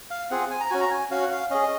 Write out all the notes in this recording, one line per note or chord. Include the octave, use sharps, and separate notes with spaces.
F5
C4 F4 G#4 F#5
G#5
A#5
C#4 F#4 G#5
A#5
G#5
C#4 F#4 F5
F#5
F5
C#4 G#4 D#5